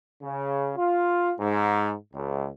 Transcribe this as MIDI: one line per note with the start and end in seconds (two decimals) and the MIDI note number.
0.22 0.71 49
0.77 1.31 65
1.40 1.94 44
2.14 2.48 37